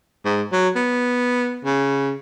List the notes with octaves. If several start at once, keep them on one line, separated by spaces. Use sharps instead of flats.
G#2
F#3
B3
C#3